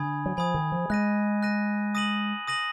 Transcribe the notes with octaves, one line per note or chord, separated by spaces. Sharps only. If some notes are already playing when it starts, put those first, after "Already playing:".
Already playing: D3 G#5 B5 D#6 G#6
F#3
F3 G#5 B5 D#6 G#6
D#3
F3
G#3 F#6 A#6 D#7
F#6 A#6 D#7
D#6 A#6 D#7 F#7
D#6 A#6 D#7 F#7